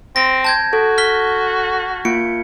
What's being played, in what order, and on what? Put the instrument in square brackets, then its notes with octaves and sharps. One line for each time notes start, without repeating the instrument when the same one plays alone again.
[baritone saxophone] C4 [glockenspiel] A#6
[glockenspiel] A5 G6 G#6
[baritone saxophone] F#4 [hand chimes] A4
[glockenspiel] F6 B6 G7
[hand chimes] A#3 F4 D7 [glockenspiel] C#7